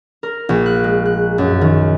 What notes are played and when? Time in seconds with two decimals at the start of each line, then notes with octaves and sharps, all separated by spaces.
0.23 A#4
0.49 A#1
0.66 F#6
0.84 G#3
1.06 F#6
1.38 F#2
1.61 D#3